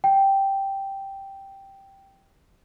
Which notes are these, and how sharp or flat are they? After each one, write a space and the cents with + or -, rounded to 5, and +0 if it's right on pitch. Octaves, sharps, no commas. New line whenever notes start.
G5 -5